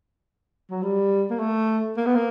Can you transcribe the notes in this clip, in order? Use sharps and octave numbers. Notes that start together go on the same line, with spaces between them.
F#3
G3
A#3
A3
A#3
B3
A#3